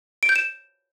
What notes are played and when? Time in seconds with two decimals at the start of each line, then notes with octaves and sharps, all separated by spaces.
0.23 D7
0.29 G6
0.36 E7